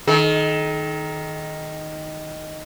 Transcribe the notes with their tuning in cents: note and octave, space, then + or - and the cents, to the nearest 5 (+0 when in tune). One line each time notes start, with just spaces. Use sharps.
D#3 +0 A4 -45